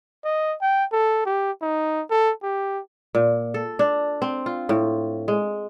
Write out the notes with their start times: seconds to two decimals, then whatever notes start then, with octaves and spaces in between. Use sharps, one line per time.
0.24 D#5
0.61 G5
0.92 A4
1.26 G4
1.62 D#4
2.10 A4
2.43 G4
3.15 A#2
3.54 A4
3.79 D4
4.22 C4
4.46 F4
4.69 A2
5.28 G#3